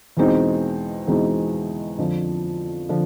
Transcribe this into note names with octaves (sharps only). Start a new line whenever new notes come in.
E2 B2 G#3 C4 D#4
E2 B2 G#3 C4 D#4
F2 D3 F3
D3 F3